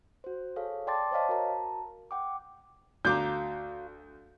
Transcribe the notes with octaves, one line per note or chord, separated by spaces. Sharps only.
F#4 C5
G#4 A4 C#5 F5
D5 G5 A5 C6 D6 A6
C5 C#5 D#5 F5 A5
F#4 A#4 A5 A#5
F#5 G5 D6
D2 F#4 F5 A#5 D6 G6